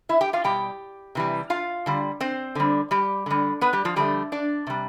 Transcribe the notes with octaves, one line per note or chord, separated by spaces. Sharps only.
E4 E5
G4 G5
F4 F5
B2 G3 G4 G5
C3 E3 G3
F4 F5
D3 G3
C4 C5
D3 G3
G3 G4
D3 G3
B3 B4
G3 G4
F3 F4
D3 F3 G3 A3 G4
D4 D5
C3 G3